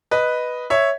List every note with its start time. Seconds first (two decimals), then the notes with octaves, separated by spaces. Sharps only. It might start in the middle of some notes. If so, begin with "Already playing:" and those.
0.11 B4 D#5
0.70 C#5 E5